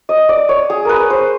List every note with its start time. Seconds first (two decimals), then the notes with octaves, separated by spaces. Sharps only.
0.09 D#5
0.29 D5
0.49 C#5
0.70 G#4
0.85 A#4 B4
1.10 C5